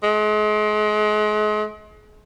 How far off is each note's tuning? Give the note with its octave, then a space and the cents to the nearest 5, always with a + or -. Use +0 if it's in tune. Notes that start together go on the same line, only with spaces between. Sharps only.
G#3 +35